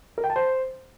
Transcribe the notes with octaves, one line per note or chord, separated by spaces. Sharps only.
A#4
G5
A5
C5